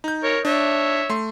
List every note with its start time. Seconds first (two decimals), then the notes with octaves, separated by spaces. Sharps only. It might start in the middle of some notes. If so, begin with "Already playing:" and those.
0.04 D#4 G6
0.24 A#4 C#5
0.45 D4 C#5 E5
1.09 A3 C6